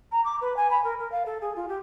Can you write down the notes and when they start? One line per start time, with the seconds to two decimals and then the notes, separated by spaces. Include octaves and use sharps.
0.11 A#5
0.24 D6
0.41 B4
0.56 G#5
0.70 B5
0.84 A#4
0.99 A#4
1.11 F5
1.25 A4
1.41 G#4
1.55 F4
1.68 G4